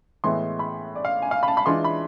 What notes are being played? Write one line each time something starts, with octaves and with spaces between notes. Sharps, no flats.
A2 E3 G#3 B3 E4 C6
B5
D5
F5
G#5
F5
B5
A5
B5
E3 G#3 D4 F4 C6
B5